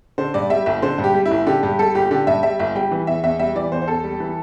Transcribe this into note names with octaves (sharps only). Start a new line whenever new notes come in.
D3 C5
G2 D5
G3 E5
G1 E5
D3 C5
G2
G4
G3
E4
G1
D3 G4
G2 G4
G3 A4
G1 G4
D3 G4
G2 E5
G3 E5
G1 E5
G3 G5
E3
E2 E5
E2 E5
G3 E5
E3 D5
E2 C5
C5
E2 A4
G3
E3